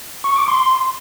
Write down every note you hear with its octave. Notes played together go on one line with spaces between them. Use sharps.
C#6
D6
C6